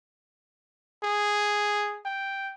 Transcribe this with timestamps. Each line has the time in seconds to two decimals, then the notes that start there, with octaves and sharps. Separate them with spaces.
1.04 G#4
2.06 G5